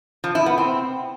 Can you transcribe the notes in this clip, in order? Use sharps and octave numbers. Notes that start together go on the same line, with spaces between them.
F3
E4
B3
C4